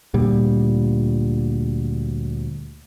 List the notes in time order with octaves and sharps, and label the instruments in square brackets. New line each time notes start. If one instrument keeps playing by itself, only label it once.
[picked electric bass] D2 A#2 G3